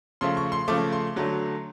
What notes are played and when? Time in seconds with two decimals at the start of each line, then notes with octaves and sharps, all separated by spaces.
0.21 C#3 F3 A3 C6
0.37 C#6
0.52 C6
0.68 C#3 F3 A3 D6
0.93 C6
1.16 D3 F#3 A3